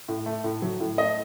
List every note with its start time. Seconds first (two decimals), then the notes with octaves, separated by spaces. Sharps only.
0.08 A2
0.26 A3
0.44 A2
0.62 F#3
0.80 A2
0.98 A3 D#5